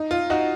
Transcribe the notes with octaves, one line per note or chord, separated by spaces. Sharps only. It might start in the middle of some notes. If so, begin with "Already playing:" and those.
Already playing: D#4
F4
D#4 F#4